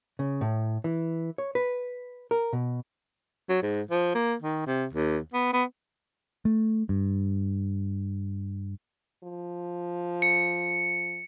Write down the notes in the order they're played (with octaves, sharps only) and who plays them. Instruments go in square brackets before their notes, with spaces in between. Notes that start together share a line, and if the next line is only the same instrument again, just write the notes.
[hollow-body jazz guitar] C#3
A2
E3
C#5
B4
A#4
B2
[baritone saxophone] F#3
G#2
F3
A#3
D#3
C3
D#2
B3
B3
[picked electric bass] A3
G2
[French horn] F3
[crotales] C#7